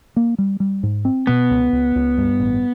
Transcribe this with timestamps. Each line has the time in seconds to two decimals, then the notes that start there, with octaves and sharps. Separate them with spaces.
0.16 A#3
0.38 G3
0.60 G3
0.83 G#2
1.05 C4
1.27 B2 B3
1.50 C#2
1.73 C#2
1.95 C#2
2.18 G2
2.40 A1